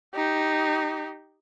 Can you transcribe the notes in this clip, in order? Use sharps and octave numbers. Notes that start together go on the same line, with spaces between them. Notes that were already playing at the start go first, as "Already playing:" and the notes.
D#4 G4